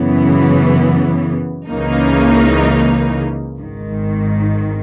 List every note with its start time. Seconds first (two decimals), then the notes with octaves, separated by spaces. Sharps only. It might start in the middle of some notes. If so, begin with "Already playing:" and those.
Already playing: F#2 C#3 E3 B3
1.68 C#2 C#3 E3 A#3 D#4
3.57 G#1 G#2 D#3